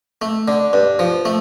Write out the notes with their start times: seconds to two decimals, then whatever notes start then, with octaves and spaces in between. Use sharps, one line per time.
0.22 A3
0.48 D3
0.73 G2
0.99 F3
1.25 A3